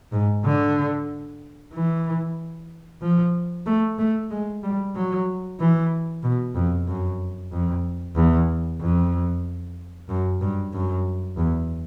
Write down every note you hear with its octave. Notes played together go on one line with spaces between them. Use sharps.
G#2
D3
E3
F3
A3
A3
G#3
G3
F#3
E3
B2
F2
F#2
F2
E2
F2
F#2
G2
F#2
E2